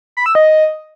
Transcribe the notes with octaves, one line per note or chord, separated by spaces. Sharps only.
B5
E6
D#5